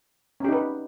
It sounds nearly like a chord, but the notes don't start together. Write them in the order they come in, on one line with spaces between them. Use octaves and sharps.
C#4 G4 D#4 B4